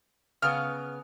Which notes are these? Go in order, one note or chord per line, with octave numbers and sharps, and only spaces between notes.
C#3 B3 F6